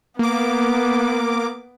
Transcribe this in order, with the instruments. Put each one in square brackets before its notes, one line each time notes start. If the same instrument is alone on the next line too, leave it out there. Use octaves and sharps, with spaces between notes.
[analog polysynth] A#3 D6 [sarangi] B3